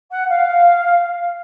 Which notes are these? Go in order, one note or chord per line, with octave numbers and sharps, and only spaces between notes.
F#5
F5